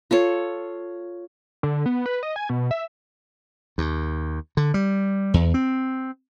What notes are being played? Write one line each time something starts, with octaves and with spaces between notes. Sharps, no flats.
F4 A4 C#5
D3
B3
B4
D#5
G#5
B2
E5
D#2
D3
G3
E2
C4